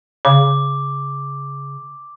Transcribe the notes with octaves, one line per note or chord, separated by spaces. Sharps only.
C#3 D6